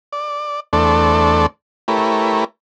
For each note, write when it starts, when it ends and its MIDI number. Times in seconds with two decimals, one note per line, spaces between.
0.13 0.60 74
0.73 1.46 40
0.73 1.46 57
0.73 1.46 62
0.73 1.46 69
0.73 1.46 72
0.73 1.46 74
1.88 2.44 57
1.88 2.44 64
1.88 2.44 67
1.88 2.44 70
1.88 2.44 71
1.88 2.44 73